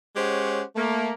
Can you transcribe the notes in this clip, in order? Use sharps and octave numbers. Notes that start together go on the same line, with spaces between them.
G#3 C#4 G4 C5 C#5 F#5
A3 A#3